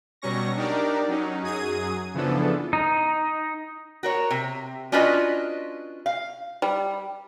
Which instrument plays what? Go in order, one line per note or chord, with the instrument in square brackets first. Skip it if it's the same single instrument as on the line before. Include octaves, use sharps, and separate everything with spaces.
[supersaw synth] B2 F#3 G3 C#4 C#6 A#6
D4 D#4 G4 A#4 D5
F#3 C#4 D#4
F#2 F#3 G#4 D#6 G#6 D#7
C#3 E3 F3 B3 D4 A4
[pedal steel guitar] D#4
[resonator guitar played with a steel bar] F#4 A#4 C#5
C3
C#4 D4 F4 F#4 B4 D#5
F5
[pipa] G3